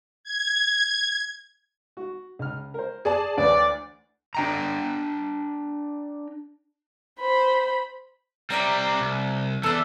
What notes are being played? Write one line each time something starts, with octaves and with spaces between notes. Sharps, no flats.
G#6
F#4
C#2 F6
A#4 C5
G#4 D5 A5
D2 E3 B4 C#5 D5
D4 G5 A#5
C5 B5
G3 C4 E4 D5 A#5
C2
E2 E3 A4 D5 E6